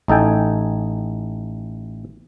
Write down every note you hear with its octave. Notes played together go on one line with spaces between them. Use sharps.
A1 D#4 A4 G5 G#5